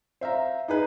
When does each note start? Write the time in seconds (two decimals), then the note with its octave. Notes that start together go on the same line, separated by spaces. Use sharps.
0.21 C5 E5 F5 A#5
0.68 D#4 G#4 B4